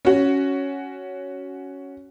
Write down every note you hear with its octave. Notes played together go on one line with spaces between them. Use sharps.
C#4 F#4